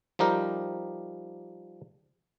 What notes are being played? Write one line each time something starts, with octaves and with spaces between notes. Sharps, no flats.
F3 G3 D#4 G4 A#4